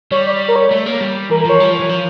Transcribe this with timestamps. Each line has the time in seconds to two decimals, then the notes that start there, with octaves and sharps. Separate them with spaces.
0.12 G3 C#5
0.27 D5
0.48 A#4
0.56 C#5
0.71 A3
0.86 A#3
1.01 G3
1.30 E3 A#4
1.41 A#4
1.45 F3 C#5
1.60 G3
1.70 F3
1.80 E3
1.89 F3